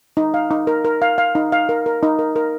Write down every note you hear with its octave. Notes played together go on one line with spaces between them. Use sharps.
D#4
F5
D#4
A#4
A#4
F5
F5
D#4
F5
A#4
A#4
D#4
A#4
A#4